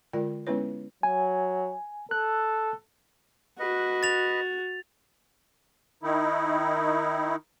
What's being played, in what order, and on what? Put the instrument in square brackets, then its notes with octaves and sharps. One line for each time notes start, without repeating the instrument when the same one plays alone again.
[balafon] D3 G#3 F4 A#4 D5 G5
G#3 B3 C#4 E4 B4 C#5
[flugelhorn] F#3 [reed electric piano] G#5
[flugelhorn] A4 [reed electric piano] F#6
[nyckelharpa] F#4 [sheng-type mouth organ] B4 D#5
[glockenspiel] A6 F7
[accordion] D#3 D#4 E4